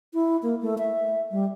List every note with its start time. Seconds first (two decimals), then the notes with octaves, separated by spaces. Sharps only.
0.14 E4
0.43 A#3
0.62 A3
0.78 E5
1.31 G3